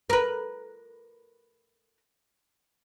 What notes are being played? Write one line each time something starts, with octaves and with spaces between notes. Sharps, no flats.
A#4 B4